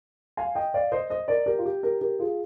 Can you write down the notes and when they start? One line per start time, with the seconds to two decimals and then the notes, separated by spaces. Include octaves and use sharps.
0.37 F5 G#5
0.55 D#5 G5
0.74 D5 F5
0.92 C5 D#5
1.10 C5 D#5
1.28 A#4 D5
1.46 G4 A#4
1.58 F4
1.65 G4
1.83 G4 A#4
2.01 G4 A#4
2.19 F4 G#4